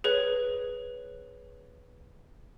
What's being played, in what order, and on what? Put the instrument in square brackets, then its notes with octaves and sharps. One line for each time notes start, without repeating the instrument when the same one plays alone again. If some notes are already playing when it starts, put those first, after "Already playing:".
[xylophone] G#4 B4 C#5